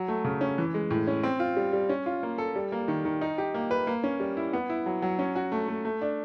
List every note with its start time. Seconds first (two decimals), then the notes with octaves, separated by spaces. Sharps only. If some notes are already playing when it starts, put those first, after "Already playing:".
Already playing: F#3
0.08 A3
0.24 C#3
0.41 C#4
0.58 E3
0.74 G#3
0.91 A2
1.07 C#4
1.23 C4
1.40 F4
1.57 G3
1.73 G3
1.89 C#4
2.06 F4
2.23 A#3
2.38 A4
2.56 G3
2.72 A#3
2.88 D#3
3.05 D#3
3.21 D#4
3.38 G4
3.54 A#3
3.71 B4
3.87 A#3
4.04 C#4
4.20 G3
4.37 E4
4.53 B3
4.70 E4
4.86 F#3
5.02 F#3
5.19 C#4
5.36 F#4
5.52 A3
5.68 A3
5.85 A3
6.02 D4